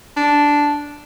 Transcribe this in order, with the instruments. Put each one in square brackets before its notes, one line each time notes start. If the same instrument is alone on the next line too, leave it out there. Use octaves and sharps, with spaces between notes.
[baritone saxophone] D4